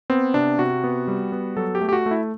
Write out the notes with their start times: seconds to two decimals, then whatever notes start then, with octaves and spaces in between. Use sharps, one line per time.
0.10 B3 C4
0.34 C3 D4
0.59 C3 F#4
0.84 B3
1.08 G3
1.32 B3
1.57 F#3 A4
1.75 G4
1.81 A3
1.89 G4
1.93 F#4
2.06 A3
2.11 E4